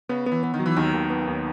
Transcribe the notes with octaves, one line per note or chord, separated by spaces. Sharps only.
C#3 B3
B3
E3
B3
D#3
F#3
E3
D#2 D#3
D#2
B3
D#2